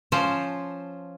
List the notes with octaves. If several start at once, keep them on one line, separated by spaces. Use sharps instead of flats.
F3 C#4 C5 A5